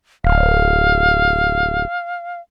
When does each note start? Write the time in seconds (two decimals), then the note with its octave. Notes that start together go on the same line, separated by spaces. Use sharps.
0.24 D1 F5